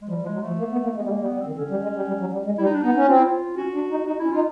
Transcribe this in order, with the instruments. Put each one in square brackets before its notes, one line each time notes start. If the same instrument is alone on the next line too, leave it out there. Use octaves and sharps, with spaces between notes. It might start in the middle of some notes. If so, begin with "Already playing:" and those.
[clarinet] G#3
[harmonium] F3 [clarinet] G3
[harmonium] F3
[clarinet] G#3
[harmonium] F#3
[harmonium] F3 [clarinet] A3
[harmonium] A#3
B3
A#3
G#3
[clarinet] B3
[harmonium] G3
[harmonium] G#3 [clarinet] A#3
[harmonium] G3
[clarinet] B3
[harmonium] G3
[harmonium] D#3 [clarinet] C4
[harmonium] D3 [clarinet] C#4
[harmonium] G3
G#3
G3
G3
F#3
G3
G#3
[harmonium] G3 [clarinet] E4
[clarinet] D#4
D4
[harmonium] B3 [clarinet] D#4
[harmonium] C#4
[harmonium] C4 [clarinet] F4
[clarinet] E4
F4
[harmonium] C#4 [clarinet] F#4
[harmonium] D4
D#4
[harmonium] D#4 [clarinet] F#4
[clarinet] E4
[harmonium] C#4
[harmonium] D#4 [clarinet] F4